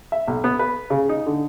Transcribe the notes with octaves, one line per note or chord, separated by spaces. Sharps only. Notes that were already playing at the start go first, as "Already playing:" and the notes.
E5
B1
B3
B4
C#3
D#4
D3